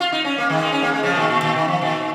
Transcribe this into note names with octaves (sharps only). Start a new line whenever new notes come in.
F4
D#4
C#4
A#3
D#3 G#3
D#4
C#4
A#3
G#3
C#3 F3
A#2 D#3
A#2
A#2 D#3
D#3
F3
A#2 D#3